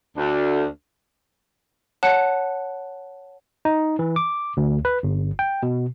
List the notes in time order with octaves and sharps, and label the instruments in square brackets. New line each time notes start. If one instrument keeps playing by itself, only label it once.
[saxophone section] D2 [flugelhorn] D4
[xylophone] C#5 F#5 A5 F#6 C#7
[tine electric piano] D#4
E3
D6
D2
B4
G1
G5
B2